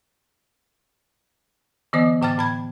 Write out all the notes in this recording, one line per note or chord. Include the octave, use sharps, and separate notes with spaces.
D3 E3 B3 D#5 D#6
A2 D3 G5 D6 F6 A6
A2 B5 G#6